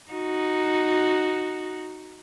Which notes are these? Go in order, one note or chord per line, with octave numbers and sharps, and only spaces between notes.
D#4 F#4